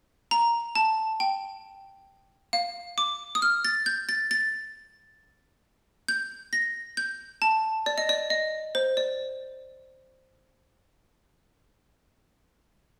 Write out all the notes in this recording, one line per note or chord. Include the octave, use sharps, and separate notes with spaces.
A#5
A5
G5
F5
D6
D#6
F6
A6
G6
A6
A6
G6
A#6
G6
A5
D5
D#5
D5
D#5
C5
D5